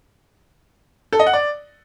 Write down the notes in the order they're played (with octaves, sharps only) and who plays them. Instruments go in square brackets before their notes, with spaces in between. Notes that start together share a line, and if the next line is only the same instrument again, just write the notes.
[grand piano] A4
D#5
F#5
D5